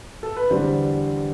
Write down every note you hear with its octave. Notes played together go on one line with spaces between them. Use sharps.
A4
B4
E2 D3 G3 C5